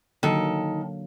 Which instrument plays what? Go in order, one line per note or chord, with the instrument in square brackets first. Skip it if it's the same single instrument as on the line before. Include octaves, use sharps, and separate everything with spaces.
[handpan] D3 F#3 A#3 [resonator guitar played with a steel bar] D#3 A4